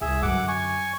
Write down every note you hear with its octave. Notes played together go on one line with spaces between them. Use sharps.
C2 G#4 E5
F#2 D3 F#5 D6
G#5 C#6